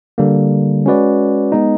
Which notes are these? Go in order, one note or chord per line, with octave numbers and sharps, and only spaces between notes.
D3 G3 A#3
G#3 C#4 F#4 B4 D5
G#3 B3 D#4